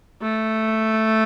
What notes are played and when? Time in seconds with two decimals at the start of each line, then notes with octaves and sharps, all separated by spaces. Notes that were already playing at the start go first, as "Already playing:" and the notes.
0.21 A3